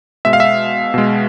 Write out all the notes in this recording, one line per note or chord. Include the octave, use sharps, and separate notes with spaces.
B2 G#3 E5
F5
E5
B2 G#3